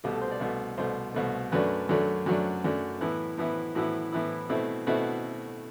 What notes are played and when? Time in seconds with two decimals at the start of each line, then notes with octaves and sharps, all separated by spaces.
0.04 C2 B2 A3 G4
0.13 A4
0.21 C5
0.31 D5
0.40 C2 B2 A3
0.78 C2 B2 A3 C5
1.14 C2 B2 A3
1.52 F#2 F#3 A3 D4 B4
1.89 F#2 F#3 A3 D4
2.26 F#2 F#3 A3 D4 F#4
2.64 F#2 F#3 A3 D4
3.01 A2 E3 B3 E4
3.38 A2 E3 B3 E4
3.75 A2 E3 B3 E4 F#4
4.12 A2 E3 B3 E4
4.49 B2 A3 C4 E4
4.87 B2 A3 C4 E4 F#4